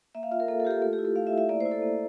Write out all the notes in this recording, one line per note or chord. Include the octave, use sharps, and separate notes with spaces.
A#3 E5
F5
F4 E5
A#4
A#3 A4
A4
F4 G4
A4
A3 A4
G4
E4
A4
A3 F5
E5
E4
E5
A#3 D5
E4 C5
A4
A#3